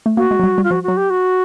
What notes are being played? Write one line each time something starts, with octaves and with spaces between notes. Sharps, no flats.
A3
A#3 F#4
G#3
F#3
G3
G3
F4
F3 F#4
F#3 F#4
G4
F#4